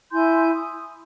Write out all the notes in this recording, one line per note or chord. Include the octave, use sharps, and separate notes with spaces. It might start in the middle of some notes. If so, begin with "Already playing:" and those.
E4 G#5 C6 G6
D#6